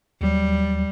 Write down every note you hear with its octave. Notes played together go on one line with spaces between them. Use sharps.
D#2 F#3 G3